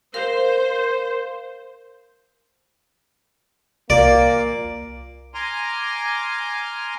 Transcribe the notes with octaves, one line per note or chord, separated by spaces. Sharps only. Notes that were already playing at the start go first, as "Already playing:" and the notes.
A#4 C5 F5
C2 A#2 A#3 D5
G#5 A#5 C6 D6 F6